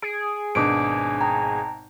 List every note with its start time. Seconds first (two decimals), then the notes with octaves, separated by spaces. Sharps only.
0.02 G#4 D7
0.55 G#1 B2 D4 D6 D7
1.21 G5 A5 A#5